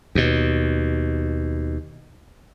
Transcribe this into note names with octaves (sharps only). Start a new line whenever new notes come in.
D#2 B2